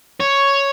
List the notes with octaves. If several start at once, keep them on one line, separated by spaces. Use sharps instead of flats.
C#5